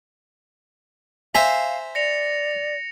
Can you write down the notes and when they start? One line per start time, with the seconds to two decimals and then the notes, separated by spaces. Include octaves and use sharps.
1.35 C5 E5 F5 G#5 A#5
1.95 D5 A#6 C#7 F7